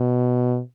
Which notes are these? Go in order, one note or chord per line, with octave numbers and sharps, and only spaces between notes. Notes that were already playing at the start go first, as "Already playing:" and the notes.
Already playing: B2